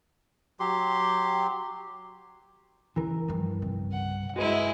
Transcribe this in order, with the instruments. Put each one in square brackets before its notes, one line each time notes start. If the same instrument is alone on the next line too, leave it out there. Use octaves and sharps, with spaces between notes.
[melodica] F#3 G4 C6
[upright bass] C#3 C#4 [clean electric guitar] E3 A#4
[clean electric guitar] G2 [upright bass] D#3 F3
[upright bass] C2 C#3
[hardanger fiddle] F#5
[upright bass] G1 [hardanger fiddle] G#3 E4 [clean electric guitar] F#4 B4